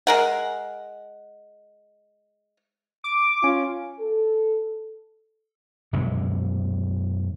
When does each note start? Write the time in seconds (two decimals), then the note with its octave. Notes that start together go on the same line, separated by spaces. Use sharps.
0.07 G#3 A#4 F#5
3.04 D6 D7
3.44 C#4 F4
4.00 A4
5.93 F#2 B2 D3 G#3